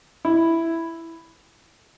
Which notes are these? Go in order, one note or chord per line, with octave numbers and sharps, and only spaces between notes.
E4